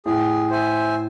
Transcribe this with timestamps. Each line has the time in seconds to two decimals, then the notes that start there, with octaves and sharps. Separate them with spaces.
0.06 A2 G#4
0.50 C5 E5 G#5